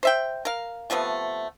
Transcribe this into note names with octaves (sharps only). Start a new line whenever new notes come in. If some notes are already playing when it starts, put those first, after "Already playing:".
C5 E5 G5
A#4 F5
C3 F3 A3 B3